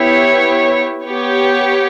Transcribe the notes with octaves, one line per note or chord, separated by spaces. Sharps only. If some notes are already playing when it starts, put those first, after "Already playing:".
Already playing: B3 E4 G4 C#5
B3 G4 C#5